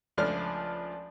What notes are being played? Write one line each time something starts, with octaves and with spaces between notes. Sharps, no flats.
C#2 F3 A3 D4 F6